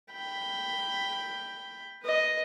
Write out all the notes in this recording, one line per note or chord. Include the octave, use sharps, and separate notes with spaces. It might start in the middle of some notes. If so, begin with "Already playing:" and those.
G5 B5
B4 D#5